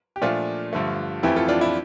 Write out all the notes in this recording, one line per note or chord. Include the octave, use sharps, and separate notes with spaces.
G4
A#2 F3 A3 D4 F4
G2 D3 F3 A3
F2 E3 A3 E4 G4
F4 A4
D4 F4
E4